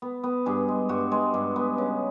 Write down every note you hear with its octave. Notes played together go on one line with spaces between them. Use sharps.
B3
B3
G2 G#4
G#3
G2 F#4
G#3
G2
B3
C#3